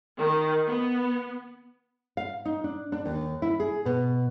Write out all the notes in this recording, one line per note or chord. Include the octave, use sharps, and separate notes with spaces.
D#3
B3
F5
D#4
D4
D4
D#2
E4
G#4
B2